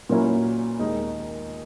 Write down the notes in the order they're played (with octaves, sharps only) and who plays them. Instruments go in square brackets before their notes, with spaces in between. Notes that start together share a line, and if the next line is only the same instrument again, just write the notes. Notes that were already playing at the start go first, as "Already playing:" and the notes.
[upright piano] A#2 F#3 A#3 C#4 E4
D#2 D#3 G#3 D#4